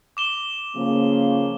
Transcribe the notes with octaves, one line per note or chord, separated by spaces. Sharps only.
D6 E7 G7
C#3 F3 A#3